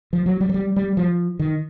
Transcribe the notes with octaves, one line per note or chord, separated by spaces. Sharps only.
F3
F#3
G3
F#3
G3
G3
F3
D#3